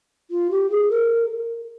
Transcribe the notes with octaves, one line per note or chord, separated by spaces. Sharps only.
F4
G4
G#4
A#4